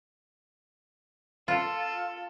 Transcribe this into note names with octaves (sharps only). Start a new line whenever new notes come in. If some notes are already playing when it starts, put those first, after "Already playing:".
F4 A4